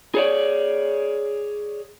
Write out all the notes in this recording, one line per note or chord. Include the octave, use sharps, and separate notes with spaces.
G#4 C#5 D5